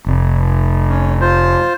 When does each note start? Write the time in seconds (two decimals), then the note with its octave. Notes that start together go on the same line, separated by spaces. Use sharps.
0.06 F1
0.89 C#4
1.21 F4 C5